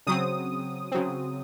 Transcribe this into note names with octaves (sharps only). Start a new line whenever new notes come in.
C#3 F#3 C4 D#6
C#3 F#3 C4